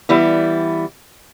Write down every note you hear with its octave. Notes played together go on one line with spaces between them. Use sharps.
E3 G3 B3 E4